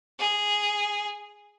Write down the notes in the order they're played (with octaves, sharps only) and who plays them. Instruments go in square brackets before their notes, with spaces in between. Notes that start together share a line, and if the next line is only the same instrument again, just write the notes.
[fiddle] G#4